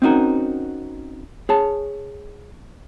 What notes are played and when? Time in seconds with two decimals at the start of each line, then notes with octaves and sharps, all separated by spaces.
0.02 C4 C#4 D#4 F#4 A#4
1.49 G#4 C#5 A5